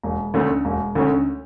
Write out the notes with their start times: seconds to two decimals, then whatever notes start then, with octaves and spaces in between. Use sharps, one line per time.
0.03 E1
0.34 D2 D3 A3 C#4
0.65 E1
0.95 D2 D3 A3 C#4